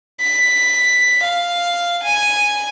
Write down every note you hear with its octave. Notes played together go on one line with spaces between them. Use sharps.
B6
F5
G#5